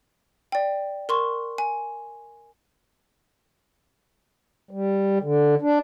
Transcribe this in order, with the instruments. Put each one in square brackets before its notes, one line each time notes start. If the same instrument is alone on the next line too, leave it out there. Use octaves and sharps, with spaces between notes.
[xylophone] D5 G5
A#4 C6 C#6
G#5
[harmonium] G3
D3
D4